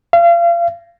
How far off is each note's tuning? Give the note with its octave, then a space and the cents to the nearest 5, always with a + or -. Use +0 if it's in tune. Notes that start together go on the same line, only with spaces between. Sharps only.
F5 -35